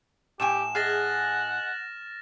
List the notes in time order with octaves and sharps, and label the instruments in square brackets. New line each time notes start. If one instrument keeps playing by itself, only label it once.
[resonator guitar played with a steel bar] A2 G5 G#5 [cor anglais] G4 [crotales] E7
[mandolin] G#4 D#5 [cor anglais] F#5 [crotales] F6 A6 A#6